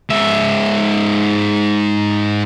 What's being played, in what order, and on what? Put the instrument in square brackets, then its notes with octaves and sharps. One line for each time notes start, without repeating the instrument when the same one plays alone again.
[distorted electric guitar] G#2 E5